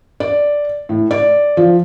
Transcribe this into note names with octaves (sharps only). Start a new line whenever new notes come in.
D5
A2
D5
F3